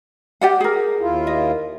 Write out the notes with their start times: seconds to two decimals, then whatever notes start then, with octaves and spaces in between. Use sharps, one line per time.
0.41 G4 D5 F#5
0.60 G#4 A#4
1.00 D#2 E4 F4
1.27 D#5